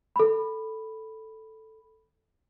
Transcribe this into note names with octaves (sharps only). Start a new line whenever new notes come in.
A4 B5